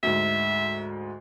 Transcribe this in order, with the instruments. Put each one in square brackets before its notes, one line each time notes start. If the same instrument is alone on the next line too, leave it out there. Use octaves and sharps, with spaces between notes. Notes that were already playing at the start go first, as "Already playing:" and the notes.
[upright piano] D2 G#2 [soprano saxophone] E5